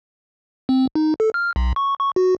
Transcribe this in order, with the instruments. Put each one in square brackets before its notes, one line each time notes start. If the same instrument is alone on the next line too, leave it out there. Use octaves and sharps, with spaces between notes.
[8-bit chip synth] C4
D#4
A4
F6
B1
C#6
C#6
F#4